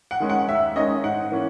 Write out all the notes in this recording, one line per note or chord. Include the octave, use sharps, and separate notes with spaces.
F#5
D#3 G#3 C#4
F#5
D#2 E5
D#3 G#3 C#4 D#5
G#2 F#5
E3 A#3 C#4